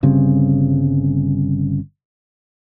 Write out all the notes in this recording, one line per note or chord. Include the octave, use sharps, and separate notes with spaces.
G1 C#3 G3 C4